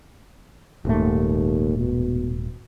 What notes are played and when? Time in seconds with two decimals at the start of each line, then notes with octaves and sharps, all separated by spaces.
0.85 D#1 D#2 G#2 A3
1.79 B2